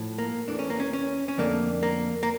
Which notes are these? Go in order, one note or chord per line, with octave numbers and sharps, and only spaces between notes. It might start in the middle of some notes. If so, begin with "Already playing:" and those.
Already playing: A2 F3
A#3
E2 E3 A3 D4
C#4
A#3
C#4
C#4
C#4
F2 D3 A3 A#3
A#3
A#3